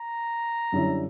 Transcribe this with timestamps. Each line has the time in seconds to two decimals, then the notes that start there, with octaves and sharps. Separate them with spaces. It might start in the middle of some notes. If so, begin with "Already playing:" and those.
Already playing: A#5
0.72 F#2 D3 G3 C#4 E4